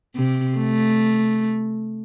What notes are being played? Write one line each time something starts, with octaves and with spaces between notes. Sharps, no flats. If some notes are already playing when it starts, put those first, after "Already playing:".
C3
A3